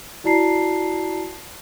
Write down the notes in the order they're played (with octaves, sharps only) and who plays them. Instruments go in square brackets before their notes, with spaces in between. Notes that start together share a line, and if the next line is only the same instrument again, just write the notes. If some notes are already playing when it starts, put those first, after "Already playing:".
[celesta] E4 F#4 D5 A5 A#5 C7